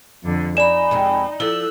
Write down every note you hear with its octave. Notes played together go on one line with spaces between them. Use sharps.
F2 D3
D#4 D5 G#5 B5 E7
F2 C3 G#3
F3 E4 A4 E6 F#6